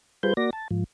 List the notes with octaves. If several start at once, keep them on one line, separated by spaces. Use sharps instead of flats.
G3 F4 G#4 B4 C5 G6
A#3 F#4 D5 A#6
A5
G#2 F3